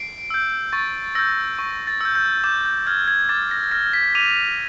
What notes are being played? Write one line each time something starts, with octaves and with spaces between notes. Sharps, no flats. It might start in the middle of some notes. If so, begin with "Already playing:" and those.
Already playing: C7 D7
E6 G6
C#6 A6
E6 G6 A#6
C#6
A6
E6 G6
G6
D6 G6
G6
F6 G#6
G#6
D6 A6
A#6
F6 A#6
B6
D6 D#7 F7